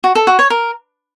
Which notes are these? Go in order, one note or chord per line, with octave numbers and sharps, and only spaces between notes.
F#4
A4
F#4
C#5
A#4